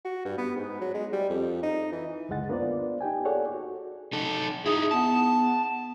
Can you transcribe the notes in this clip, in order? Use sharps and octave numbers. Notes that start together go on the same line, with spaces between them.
F#4
G2
B3
G#2
F#3
G#3
G3
F2
D#4
E3
C#2 F#2 D3 G#3 F#5 A6
A#3 B3 D4 F4 C5 D5
D#4 G4 G5 G#5
G#4 A4 C#5 D5 F#5
F#4
D#4 A4
D#4 E4 G#4
B3 A5